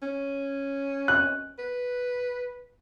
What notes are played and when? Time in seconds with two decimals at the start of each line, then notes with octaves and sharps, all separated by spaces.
0.02 C#4
1.08 F#6
1.59 B4